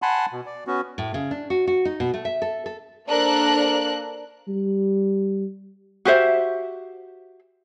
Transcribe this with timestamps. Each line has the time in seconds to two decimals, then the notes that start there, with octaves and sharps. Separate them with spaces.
0.02 F#5 G#5 A5 B5 C6
0.32 B2
0.46 D5
0.67 B3 C#4 F#4
0.98 A2
1.14 C#3
1.31 D4
1.50 F#4
1.67 F#4
1.85 D#4
2.00 B2
2.14 A3
2.25 E5
2.42 A4
2.66 A4
3.08 A#3 D4 A4 A#4 C5 F#6
4.48 G3
6.05 F#4 G4 C5 E5